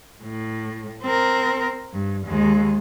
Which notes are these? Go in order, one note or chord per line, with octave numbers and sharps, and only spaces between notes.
A2
C4 A#4
G2
D#2 G#3